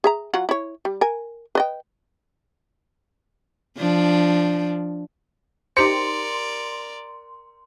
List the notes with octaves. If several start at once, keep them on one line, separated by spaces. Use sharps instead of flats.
G#4 E5 A#5
F#3 F4 F#5
E4 C#5
G3
A#4 G#5
B4 D#5 G5
F3 D4
D#4 G4 A#4 C5 D5 C6 C#7